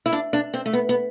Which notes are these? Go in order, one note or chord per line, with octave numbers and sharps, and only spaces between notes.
E4
D4
D4
C4
A3
B3
B3